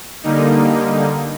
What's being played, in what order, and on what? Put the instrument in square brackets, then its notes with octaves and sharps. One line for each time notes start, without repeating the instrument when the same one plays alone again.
[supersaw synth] D3 G3 A#3 D#4